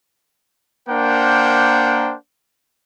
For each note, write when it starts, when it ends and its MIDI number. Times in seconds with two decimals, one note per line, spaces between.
0.89 2.14 58
0.89 2.14 62
0.89 2.14 70
0.89 2.14 72
0.89 2.14 78
0.89 2.14 79